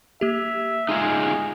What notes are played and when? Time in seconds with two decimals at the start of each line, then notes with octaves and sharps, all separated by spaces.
0.21 A#3 G4 E5
0.89 G#3 D#4 F4 G#4